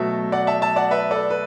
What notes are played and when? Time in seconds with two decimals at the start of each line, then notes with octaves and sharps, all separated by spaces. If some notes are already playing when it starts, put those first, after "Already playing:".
Already playing: B2 F#3 A3 E5 A5
0.32 D5 F#5
0.47 E5 A5
0.61 E5 A5
0.76 D5 F#5
0.91 B4 E5
1.11 A4 D5
1.30 B4